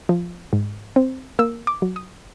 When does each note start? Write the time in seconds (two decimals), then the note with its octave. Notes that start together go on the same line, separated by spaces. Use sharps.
0.09 F3
0.53 G#2
0.96 C4
1.39 A#3 E6
1.67 D6
1.82 F#3
1.96 D#6